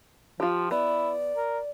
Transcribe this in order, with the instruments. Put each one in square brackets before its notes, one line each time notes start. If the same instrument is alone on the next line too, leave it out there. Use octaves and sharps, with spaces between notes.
[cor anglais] F3 [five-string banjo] F4 G4
[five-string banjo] B3 [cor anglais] E4 [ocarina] D5
[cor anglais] A#4